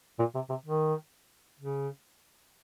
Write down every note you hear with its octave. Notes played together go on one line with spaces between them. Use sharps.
A#2
C3
C3
D#3
C#3